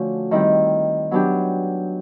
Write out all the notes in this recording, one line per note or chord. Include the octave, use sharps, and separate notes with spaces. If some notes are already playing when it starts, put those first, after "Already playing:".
Already playing: D3 F3 A3 C#4 F#4
D#3 G3 C4 E4
F#3 B3 D4 G4